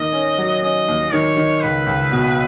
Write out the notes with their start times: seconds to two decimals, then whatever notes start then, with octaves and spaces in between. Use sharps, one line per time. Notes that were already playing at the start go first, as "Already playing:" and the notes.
Already playing: D#2 D#3 D#5
0.12 C#4
0.38 F#3
0.62 C#4 D#5
0.88 D#2
1.12 D#3 C#5
1.37 D#3
1.62 C#2 B4
1.87 C#2
2.12 B2